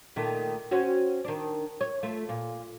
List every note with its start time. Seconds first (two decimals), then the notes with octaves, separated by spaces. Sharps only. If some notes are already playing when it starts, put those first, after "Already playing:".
0.16 A#2 D#3 A3
0.71 C4 C#4 F#4
1.24 D#3 D4
1.81 C#5
2.03 A3 F4
2.29 A#2